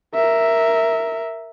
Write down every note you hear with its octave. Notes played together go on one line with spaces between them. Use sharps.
A#4 E5